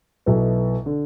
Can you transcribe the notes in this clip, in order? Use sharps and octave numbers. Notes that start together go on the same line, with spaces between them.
B1 B2 B3 E4 A4
D3